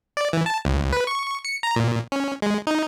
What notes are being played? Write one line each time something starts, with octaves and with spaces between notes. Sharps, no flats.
D5
E3
A5
C#2
B4
C#6
C#7
A#5
A#2
C#4
G#3
D#4